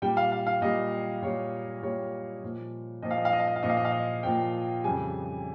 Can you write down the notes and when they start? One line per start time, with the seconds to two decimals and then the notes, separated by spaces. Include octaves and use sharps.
0.02 A#2 G3 G5
0.17 F5
0.32 F5
0.47 F5
0.62 A#2 G3 D#5
1.22 A#2 G3 C#5
1.83 A#2 G3 C#5
2.43 A#2 F3
3.02 A#2 F3 D#5
3.11 F5
3.17 D#5
3.25 F5
3.33 D#5
3.40 F5
3.47 D#5
3.56 F5
3.63 A#2 F3 D#5
3.70 F5
3.77 D#5
3.85 F5
3.92 D#5
4.23 A#2 F3 G5
4.84 F2 C#3 G3 G#5